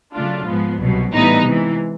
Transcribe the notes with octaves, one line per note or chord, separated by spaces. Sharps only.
C#3 F#3 A3 D4 F4
G#2 F3 G#3 B3
C2 B2 F#3
A2 E3 G3 B3 D#4
C3 E3 G#3